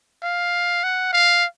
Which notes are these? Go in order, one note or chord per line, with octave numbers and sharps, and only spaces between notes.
F5
F#5
F5